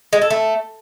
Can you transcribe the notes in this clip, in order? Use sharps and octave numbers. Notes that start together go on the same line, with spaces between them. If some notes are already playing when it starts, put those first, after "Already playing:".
G#3
A4
A3